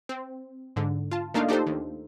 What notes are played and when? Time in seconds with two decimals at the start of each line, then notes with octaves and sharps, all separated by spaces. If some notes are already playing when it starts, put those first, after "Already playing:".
0.09 C4
0.76 G#2 D3
1.11 F4 A5
1.34 A3 A#3 D4 D#4 F4 F5
1.49 D4 D#4 G4 A4 C5
1.67 D#2